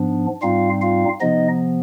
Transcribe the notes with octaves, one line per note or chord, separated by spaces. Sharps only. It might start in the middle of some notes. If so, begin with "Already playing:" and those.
Already playing: G#2 F3 B3 D4
G#2 G3 C4 D#4 F4 F5
F4 F5
C3 F3 B3 D#4 D#5